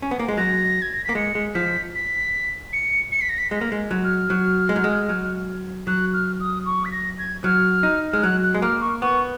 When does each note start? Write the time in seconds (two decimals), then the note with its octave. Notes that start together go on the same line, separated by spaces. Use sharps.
0.02 C#4
0.11 B3
0.19 A#3
0.28 G#3
0.37 F#3 A#6
0.82 G#6
0.93 A#6
1.04 A#3 B6
1.15 G#3 C#7
1.35 G#3
1.55 F3 B6
1.95 B6
2.73 C#7
3.12 C#7
3.21 B6
3.29 A#6
3.38 B6
3.51 G#3 A#6
3.61 A#3
3.72 G#3
3.91 F#3
4.04 F6
4.30 F#3
4.69 G#3
4.76 F#3
4.84 G#3
5.09 F#3
5.87 F#3 F#6
6.14 F6
6.40 D#6
6.66 C#6
6.85 B6
6.92 A#6
7.19 G#6
7.44 F#3 F6
7.83 D#4
8.12 G#3 F6
8.23 F#3 F#6
8.43 F#6
8.55 G#3
8.62 A#3 F6
8.81 C#6
9.02 B3 C#6